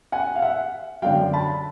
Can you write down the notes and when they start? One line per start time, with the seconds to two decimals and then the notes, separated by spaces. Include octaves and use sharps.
0.12 F#5 G#5
0.35 F5
0.42 E5 F#5
1.02 F#2 D3 F#3 F5 G5
1.33 A5 B5